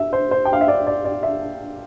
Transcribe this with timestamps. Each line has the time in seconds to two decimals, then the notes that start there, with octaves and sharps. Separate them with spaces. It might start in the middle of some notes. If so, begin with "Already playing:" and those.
Already playing: E5
0.13 C5
0.31 C5
0.45 G5
0.53 F5
0.61 E5
0.68 D5
0.87 D5
1.05 D5
1.23 E5